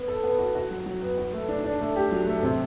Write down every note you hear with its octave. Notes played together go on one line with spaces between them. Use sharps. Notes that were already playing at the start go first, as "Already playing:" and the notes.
Already playing: B3
A4
B3
F#4
F#4
F#3
F#3
B3
F#4
A3
D4
D4
A3
G4
F#3
A3
C3